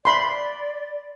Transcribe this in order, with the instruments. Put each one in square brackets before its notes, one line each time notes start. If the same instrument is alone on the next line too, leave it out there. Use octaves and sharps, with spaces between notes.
[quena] D5 [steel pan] B5 C6